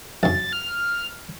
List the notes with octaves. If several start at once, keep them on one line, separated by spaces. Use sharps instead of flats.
B1 F#2 A6
F6